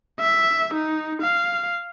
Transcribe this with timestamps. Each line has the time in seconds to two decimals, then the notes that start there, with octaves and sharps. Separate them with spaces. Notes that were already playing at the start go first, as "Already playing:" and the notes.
0.21 E5
0.74 D#4
1.22 F5